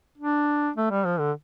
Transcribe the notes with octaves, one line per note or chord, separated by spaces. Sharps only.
D4
A3
G3
F3
D3